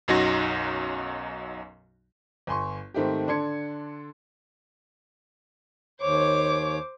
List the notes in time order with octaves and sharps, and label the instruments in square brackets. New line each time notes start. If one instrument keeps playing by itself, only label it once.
[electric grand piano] B1 F#2 F#3 D#4 F#4 A#6
[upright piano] G1 G#5 C6 C#6
G#2 D#3 A3 C4 G4
D3 D4 A4 C6 G#6 C#7
[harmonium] D#2 C#5 [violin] C5 D6